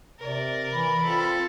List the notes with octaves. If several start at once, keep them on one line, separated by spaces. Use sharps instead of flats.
C3 A#4 D5
E3 B5
C4 F4 A4